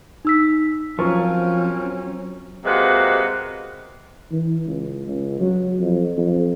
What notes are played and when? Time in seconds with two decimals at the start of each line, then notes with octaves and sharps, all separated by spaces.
0.25 D#4 E6 B6
0.99 F3 F#3 C4 C#4 F4 A#4 C#6
2.65 C3 G#3 A#3 F#4 B4
4.31 E3
4.66 C#2
5.07 C#2
5.40 F#3
5.80 F2
6.17 F2